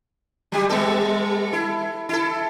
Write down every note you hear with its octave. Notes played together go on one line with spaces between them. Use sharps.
F#3 G3 G4
G3 B3 A4
E4
E4 A4